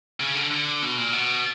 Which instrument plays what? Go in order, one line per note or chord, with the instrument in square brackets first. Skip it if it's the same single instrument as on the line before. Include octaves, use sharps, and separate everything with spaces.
[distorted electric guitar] C#3
D3
D3
B2
A#2
B2